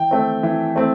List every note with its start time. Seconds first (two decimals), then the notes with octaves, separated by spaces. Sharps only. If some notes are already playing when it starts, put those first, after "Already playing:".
Already playing: E3 G5
0.11 A3 C4
0.43 E3
0.76 A3 C4